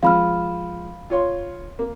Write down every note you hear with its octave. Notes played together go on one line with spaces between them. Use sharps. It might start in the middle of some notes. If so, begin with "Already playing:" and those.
F3 G#3 F5 B5 F6
F4 C#5 C6
A#3